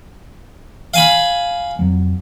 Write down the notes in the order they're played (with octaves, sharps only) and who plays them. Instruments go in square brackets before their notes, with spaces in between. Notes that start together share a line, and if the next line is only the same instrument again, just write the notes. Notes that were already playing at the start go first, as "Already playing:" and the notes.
[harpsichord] F5 G#5 B5
[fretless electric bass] F2 F#3